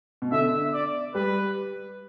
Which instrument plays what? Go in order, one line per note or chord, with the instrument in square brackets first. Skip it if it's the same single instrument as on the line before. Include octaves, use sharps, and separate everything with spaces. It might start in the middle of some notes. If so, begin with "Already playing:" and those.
[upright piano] B2
[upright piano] D3 [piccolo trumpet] E5
[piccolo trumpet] D5
[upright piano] G3 [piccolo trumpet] B4